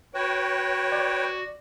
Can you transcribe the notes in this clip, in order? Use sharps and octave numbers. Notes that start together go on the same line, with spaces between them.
F#4 B4 C#5 G5
D5